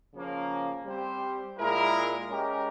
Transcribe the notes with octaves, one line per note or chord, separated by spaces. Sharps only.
C#3 F3 A#3 C#4
G3 C4 G4 C5
A#2 G#3 E4 A#4
G#3 C#4 G4 A#4